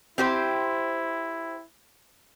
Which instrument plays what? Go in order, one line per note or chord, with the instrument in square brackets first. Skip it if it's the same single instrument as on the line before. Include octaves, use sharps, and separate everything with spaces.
[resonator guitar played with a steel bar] C4 G4 C5 [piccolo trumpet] E4